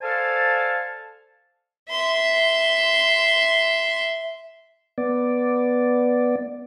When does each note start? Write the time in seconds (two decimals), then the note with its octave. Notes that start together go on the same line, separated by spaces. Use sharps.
0.01 A4 C5 D5 F5 G#5 A5
1.89 E5 C6
4.98 B3 D5